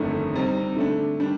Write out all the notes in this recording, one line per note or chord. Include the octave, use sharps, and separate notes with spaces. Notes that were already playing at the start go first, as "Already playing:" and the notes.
Already playing: G1 F2 D#3 A3 D4
C3 G3 C4 D#4
D3 A3 D4
D#3 G3 D4